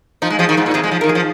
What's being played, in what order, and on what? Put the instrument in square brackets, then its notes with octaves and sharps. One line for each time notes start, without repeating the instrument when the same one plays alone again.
[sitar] F3 [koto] D#4
[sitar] G#3
[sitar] F3 [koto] G#4
[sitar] D#3
[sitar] G#2 [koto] F4
[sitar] A#2
[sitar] C3 [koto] G#4
[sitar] G#3
F3
[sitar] D#3 [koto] A#4
[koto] G#4
[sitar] F3